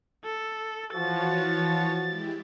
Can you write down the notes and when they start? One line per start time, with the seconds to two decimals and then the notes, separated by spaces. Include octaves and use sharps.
0.24 A4
0.94 E3 F3 F#4 C#5 A6
2.04 G#3 E4 G4